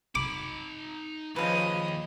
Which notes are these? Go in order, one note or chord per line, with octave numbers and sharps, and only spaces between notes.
D#4 B5 D6
D#2 C#3 F3 B4 D#5